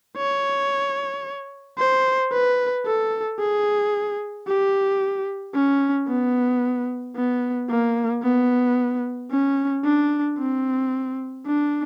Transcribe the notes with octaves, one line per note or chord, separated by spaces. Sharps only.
C#5
C5
B4
A4
G#4
G4
C#4
B3
B3
A#3
B3
C#4
D4
C4
D4